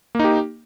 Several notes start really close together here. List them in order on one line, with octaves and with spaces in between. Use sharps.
A#3 D#4 G4